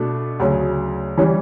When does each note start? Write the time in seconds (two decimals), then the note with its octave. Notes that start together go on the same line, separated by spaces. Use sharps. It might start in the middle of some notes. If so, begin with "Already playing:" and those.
Already playing: B2 A3 D4
0.40 D2 C#3 F#3
1.18 E3 G3 C#4